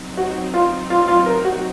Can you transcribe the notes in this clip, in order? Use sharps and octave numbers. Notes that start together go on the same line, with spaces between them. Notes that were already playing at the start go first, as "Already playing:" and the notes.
Already playing: F#3 C4 D#4
F#4
F4
F4
F4
A#4
F#4